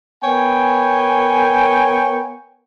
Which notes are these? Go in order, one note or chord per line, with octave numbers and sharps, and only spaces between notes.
B3 A#4 C#5 G5 G#5